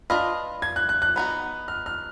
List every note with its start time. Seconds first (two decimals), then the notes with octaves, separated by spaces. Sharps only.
0.10 D4 F4 B4 D#5 F6
0.62 G#6
0.76 F#6
0.89 F#6
1.02 F#6
1.16 B3 D#4 F#4
1.68 F6
1.86 F6